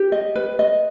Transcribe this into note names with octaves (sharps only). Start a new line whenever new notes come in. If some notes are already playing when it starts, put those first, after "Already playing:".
Already playing: G4
D#5
B4
D#5